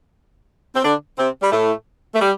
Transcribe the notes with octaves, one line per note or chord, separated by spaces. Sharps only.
C4
D3 D4
C3 C4
G3
A2 A3
A3
G3